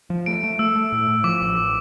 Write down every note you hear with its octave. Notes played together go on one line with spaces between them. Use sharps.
F3
A3 D7
A3
A3 E6
A3
A2
A2
F3 D6
A1